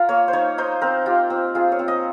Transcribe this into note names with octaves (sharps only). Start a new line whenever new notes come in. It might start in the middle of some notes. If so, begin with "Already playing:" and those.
Already playing: F4 A#4 F5
A#3 C#5
C5
D#4 C#5
D#4 C5
C4 A#4
F4 G4
C4
F4 G#4
C#5
C4
D#5